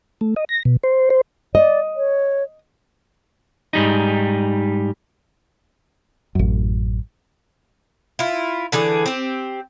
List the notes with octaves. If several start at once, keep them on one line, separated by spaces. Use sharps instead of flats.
A3
D#5
A#6
B2
C5
C5
D5 D#5
C#5
G#2 G3 D#4
A1 F#2
E4 F4
D3 E3 G#4 D5
C4 G4